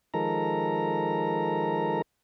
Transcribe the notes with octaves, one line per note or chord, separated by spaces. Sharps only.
D#3 F3 G#3 A4 A#4 A#5